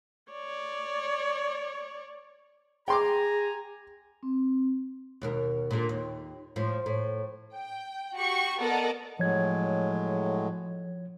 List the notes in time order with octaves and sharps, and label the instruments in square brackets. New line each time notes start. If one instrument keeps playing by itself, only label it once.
[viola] C#5 D5
[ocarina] G#4 [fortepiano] G5 C6 D6 [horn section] G#5 A#5
[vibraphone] C4
[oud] D#2 B2 A#4
A#2 D3
D#2
A2 F3
A2
[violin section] G5
F#4 G4 C#6
B3 A4 A#4 D5 D#5 F#5
[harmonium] A2 F#3 G#3 [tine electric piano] F3 C#5 G#6